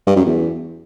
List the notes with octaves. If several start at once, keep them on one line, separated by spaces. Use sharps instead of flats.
G2
F#2
E2